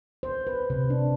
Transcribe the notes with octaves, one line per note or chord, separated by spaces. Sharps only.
C5
B4
C3
D4